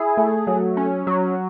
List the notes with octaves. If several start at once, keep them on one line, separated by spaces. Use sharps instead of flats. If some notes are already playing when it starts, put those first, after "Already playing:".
Already playing: E4 G#4
A3
F#3
C#4
F#3